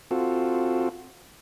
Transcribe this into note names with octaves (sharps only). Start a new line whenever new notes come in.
C4 F4 F#4 A4